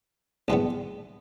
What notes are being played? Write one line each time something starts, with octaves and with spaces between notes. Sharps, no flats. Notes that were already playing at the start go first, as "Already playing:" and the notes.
A#1 G#2 E3 G3 B3